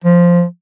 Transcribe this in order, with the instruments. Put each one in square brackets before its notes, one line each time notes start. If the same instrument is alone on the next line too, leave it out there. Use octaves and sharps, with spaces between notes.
[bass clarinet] F3